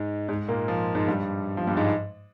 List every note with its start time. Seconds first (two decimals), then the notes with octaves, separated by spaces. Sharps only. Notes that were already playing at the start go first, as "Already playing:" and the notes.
Already playing: G#2 G#3
0.29 G#2 G#3
0.48 A#2 A#3
0.68 F3
0.94 G#2 G#3
1.08 G2 G3
1.57 F3
1.67 G2 G3
1.77 G#2 G#3